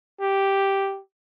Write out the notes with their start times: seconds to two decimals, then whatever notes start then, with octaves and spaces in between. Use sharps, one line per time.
0.21 G4